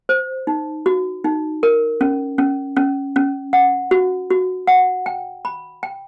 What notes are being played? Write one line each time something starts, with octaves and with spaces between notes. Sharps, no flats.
C5
D#4
F#4
D#4
A#4
C#4
C#4
C#4
C#4
F#5
F#4
F#4
F#5
G5
B5
G5